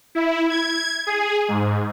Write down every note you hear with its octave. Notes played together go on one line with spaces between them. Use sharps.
E4
G#6
G#4
G#2